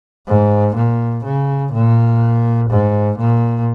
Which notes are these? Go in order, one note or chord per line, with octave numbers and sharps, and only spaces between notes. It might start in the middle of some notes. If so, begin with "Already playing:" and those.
G#2
A#2
C#3
A#2
G#2
A#2